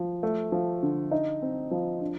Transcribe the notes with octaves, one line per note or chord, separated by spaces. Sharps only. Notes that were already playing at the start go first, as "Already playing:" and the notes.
Already playing: F3
A3
F3
D3
D#4
C4
F3
D4